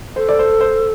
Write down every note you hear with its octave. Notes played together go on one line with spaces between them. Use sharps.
A4 C5
D5
C5
C5